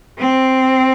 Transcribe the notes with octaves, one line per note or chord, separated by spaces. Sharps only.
C4